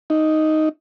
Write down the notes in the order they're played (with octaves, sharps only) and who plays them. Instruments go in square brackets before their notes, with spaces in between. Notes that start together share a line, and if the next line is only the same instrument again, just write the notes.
[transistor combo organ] D#4